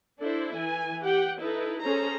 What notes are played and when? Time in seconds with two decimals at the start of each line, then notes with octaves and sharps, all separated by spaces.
0.20 D4 E4 A4 C5
0.56 E3 G#5
1.02 G4 F#5 G5
1.40 D#4 E4 A4 B4
1.81 C#4 G#4 A4 C5 A#5